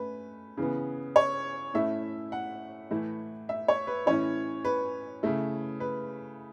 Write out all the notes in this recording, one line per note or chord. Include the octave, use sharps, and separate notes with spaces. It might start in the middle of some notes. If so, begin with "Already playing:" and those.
Already playing: A3 C#4 B4
C#3 E3 B3
C#5
A2 A3 C#4 E4 E5
F#5
A2 E3 A3 E4
E5
C#5
B4
A2 E3 C#4 E4 C#5
B4
C#3 A3 E4
B4